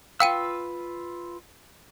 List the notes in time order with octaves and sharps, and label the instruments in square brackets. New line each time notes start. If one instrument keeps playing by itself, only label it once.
[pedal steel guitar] F4 B4 E6 [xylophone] F5 G5 D#7